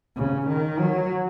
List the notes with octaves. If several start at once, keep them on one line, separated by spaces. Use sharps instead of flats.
C#3
D#3
F#3